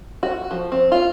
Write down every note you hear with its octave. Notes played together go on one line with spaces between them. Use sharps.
F#4
F3
C4
F4